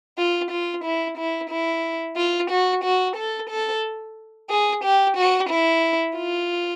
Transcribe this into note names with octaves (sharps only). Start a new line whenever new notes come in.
F4
F4
E4
E4
E4
F4
F#4
F#4
A4
A4
G#4
G4
F#4
E4
F4